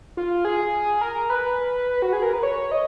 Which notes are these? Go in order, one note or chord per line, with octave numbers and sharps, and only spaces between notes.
F4
G#4
A#4
B4
F#4
G#4
A#4
B4
C#5
D#5